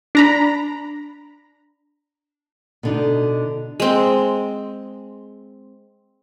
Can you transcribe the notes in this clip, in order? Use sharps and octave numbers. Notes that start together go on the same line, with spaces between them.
D4 A#5 B5
B2 D3 D#4
G#3 C4